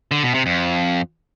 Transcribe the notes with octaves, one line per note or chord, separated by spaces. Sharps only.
D3
B2
C3
F2